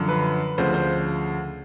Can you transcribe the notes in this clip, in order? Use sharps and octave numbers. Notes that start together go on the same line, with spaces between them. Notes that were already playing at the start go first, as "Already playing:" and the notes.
Already playing: F#2 D3 F3
B4
D2 C#3 F3 C5
C5